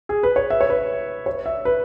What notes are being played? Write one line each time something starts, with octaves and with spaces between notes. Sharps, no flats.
G#4
B4
C#5
E5
C#5
B4
C#5
E5
B4